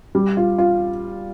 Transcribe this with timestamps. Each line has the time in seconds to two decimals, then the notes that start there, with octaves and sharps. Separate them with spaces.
0.15 G3
0.37 F4
0.58 F4